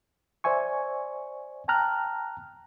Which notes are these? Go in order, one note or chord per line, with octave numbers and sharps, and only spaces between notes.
C5 D5 E5 G#5 C#6
G5 A5 A#5 F6 F#6